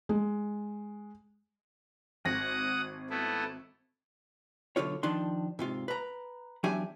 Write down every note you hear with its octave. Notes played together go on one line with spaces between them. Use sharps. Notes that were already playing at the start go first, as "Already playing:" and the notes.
G#3
G#1 F#5 D#6 A#6
A3 B3 E4
B1 G#2 D3 F4 C#5
D#3 F3 D4 C6
G#2 C3 F4
B4 A#5
E2 F#3 D4 G4 E5 G#5